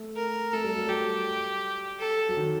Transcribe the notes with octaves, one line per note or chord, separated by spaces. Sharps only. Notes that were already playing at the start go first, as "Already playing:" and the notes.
Already playing: A3
A#4
A3 A4
G3
F#3
G3 G4
A4
F#3
D#3